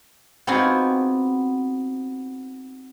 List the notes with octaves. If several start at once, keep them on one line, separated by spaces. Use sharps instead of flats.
B3 C4 D#4 F4 F#4 G#4